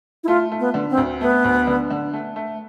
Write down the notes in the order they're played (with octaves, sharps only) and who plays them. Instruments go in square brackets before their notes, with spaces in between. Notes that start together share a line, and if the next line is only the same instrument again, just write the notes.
[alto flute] E4
[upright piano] A3 [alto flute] F4
[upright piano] A3
[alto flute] B3
[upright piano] D3
[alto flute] C4
[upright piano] D2
[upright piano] A3 [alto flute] B3
[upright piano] D2
D3
D3
A3
A3